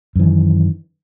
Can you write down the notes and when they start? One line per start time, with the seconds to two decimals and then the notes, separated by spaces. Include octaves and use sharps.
0.16 F#2
0.20 E3
0.24 D#3